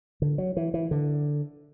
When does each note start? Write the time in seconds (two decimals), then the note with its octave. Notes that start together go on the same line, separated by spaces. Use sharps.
0.22 D3
0.38 F#3
0.57 E3
0.74 E3
0.91 D3